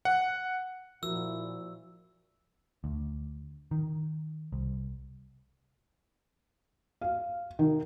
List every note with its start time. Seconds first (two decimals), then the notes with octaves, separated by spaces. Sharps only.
0.05 F#5
1.03 A#2 F3 E4 F#4 A#4 E6
2.84 D2
3.71 D#3
4.52 C2
7.01 F5
7.59 D#3